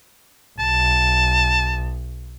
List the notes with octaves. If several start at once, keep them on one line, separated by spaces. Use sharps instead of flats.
B1 A5